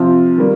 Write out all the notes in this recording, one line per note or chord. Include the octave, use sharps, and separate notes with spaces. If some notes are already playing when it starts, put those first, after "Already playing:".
Already playing: C3 F3 C4 F4
D#3 G3 A#3